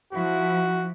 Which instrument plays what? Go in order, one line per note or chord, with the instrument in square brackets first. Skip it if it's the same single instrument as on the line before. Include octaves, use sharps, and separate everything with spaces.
[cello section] F3 E4 [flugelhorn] F#4